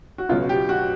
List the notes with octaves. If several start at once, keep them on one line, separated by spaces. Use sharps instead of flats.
F#4
C#2 B2 F#3 F4
G4
F#4